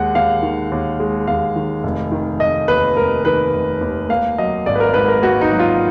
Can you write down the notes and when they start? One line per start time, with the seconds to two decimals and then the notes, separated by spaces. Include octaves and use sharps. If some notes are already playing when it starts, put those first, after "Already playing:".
Already playing: D#2 G#3 F#5
0.15 D#2 F5
0.42 D#3
0.72 D#2
1.00 G#3
1.27 D#2 F5
1.56 D#3
1.83 F1
2.12 D#3
2.40 F1 D#5
2.68 D#2 B4
2.97 F1 A#4
3.25 D#3 B4
3.53 F1
3.81 D#2
4.09 A#3 F5
4.38 F#3 D#5
4.66 G#1 D5
4.75 B4
4.80 A#4
4.94 G#2 B4
5.08 A#4
5.22 A#3 F#4
5.41 D#4
5.51 F#3
5.59 F4